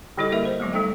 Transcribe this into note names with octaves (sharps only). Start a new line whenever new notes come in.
D3 G3 E4 G4 A4 D#5
A#3 A#4 E5
C5
F#3 G#3 A3 B3
G3 A3 D#4 A4 G5